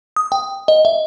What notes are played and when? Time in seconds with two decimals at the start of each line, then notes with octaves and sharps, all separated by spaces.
0.16 D#6
0.32 G5
0.68 D#5
0.85 E5